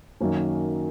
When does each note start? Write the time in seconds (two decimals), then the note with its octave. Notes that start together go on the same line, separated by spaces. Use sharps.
0.21 F#2 D#3 F#3 A#3 C#4